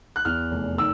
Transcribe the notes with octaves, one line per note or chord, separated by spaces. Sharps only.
F#6
E2 F6
F1
D#3 E6